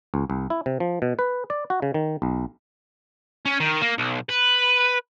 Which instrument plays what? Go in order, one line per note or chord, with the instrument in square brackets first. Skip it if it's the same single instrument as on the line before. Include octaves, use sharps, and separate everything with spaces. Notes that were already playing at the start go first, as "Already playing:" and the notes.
[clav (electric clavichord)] C#2
C2
E4
C3
F3
B2
B4
D5
F#4
C#3
D#3
B1
[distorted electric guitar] C#4
D#3
A#3
B1
B4